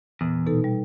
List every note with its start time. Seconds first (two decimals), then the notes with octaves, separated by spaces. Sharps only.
0.21 E2 A#2
0.46 B2 D#4 A4
0.64 G3